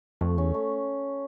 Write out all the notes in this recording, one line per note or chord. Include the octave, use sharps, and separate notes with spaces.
F2 A3
E2 C#4
A3